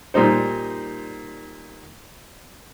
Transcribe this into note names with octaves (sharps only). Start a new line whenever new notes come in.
A#2 G3 D#4 C5